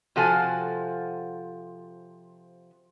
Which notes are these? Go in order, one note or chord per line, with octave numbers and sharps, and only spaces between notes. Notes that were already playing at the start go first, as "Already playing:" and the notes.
C3 F3 F#4 A4 F5 G#5